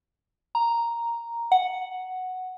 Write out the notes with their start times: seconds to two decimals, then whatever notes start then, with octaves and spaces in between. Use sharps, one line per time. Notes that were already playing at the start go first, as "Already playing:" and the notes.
0.55 A#5
1.52 F#5